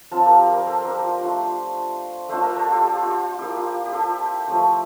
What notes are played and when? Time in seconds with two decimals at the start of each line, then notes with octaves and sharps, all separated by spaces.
0.11 F3 C4 F4 F5 A5
0.26 G4 A#4
0.40 G4
0.53 A#4 D5
0.67 A4 C5
0.85 G4 A#4
1.02 F4
1.21 A3 D4 F4
2.29 A3 D4 F4 C5 E5
2.43 A#4 D5
2.56 A4 C5
2.67 F4 G4
2.84 G4
3.02 F4
3.39 A#3 E4 G4
3.57 F4
3.86 G4
3.92 F4 A4
4.47 F3 A3 E4 G4